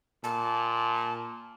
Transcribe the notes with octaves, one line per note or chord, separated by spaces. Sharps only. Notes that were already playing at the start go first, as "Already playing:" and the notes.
A#2 A5